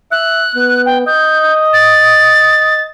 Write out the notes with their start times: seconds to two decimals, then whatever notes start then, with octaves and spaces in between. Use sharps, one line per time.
0.12 E5 F#6
0.56 B3
0.86 G5
1.07 D#5 G6
1.73 A6